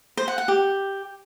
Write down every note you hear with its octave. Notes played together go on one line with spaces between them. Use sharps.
C5
F#5
F#5
G4